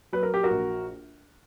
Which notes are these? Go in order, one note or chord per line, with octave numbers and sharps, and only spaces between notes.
F#3 B4
A#4
G4
F#4 A#4
A#1